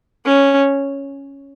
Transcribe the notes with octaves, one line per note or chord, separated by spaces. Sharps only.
C#4